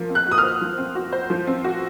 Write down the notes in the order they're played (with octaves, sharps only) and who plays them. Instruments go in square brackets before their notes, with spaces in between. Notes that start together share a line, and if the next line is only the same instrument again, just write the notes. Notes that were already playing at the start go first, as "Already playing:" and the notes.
Already playing: [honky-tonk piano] F3 A#3
C4
[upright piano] F#6
[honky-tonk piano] F#4
[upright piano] D#6
F6
[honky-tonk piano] C5
F3
C4
F#4
C5
F3
C4
F#4